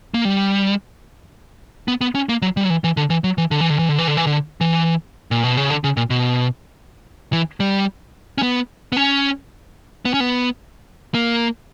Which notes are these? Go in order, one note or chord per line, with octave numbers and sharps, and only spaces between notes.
A#3
G3
B3
B3
C#4
A#3
F#3
G3
F#3
E3
E3
D3
E3
F#3
E3
D3
E3
D3
E3
D3
E3
D3
E3
D3
E3
A#2
B2
C#3
D3
C#3
A#2
B2
E3
G3
C#4
B3
B3
C#4
B3
C#4
B3
A#3